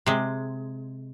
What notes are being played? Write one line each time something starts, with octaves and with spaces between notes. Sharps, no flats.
C3 G#3